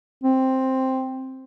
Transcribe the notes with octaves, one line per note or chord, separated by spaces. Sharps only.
C4